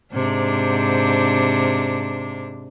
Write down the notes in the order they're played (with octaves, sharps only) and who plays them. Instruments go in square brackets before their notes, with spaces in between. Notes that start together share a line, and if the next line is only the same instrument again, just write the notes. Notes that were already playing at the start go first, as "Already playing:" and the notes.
[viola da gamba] G#2 C3 D4